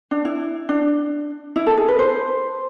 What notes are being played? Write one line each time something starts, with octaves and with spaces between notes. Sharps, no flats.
D4
E4
D4
E4
A4
G#4
B4
C5